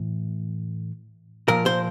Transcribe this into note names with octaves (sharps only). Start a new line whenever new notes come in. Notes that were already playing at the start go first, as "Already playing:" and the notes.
Already playing: A2 E3
A#2 F3 A#4
C5